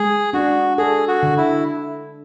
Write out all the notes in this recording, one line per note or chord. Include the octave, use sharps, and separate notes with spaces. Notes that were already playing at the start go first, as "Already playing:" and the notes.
Already playing: G#3 G#4
D4 F#4
G#4 A4
F#4
D3
E4